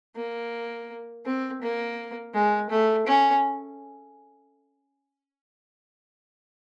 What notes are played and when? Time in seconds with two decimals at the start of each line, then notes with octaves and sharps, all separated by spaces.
0.16 A#3
1.25 C4
1.62 A#3
2.34 G#3
2.70 A3
3.07 C#4